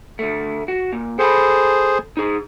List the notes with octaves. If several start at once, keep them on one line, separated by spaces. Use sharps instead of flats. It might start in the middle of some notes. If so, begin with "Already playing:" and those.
D2 A3
F#4
A#2
G#4 A4 C5 G5 B5
D#4 G#4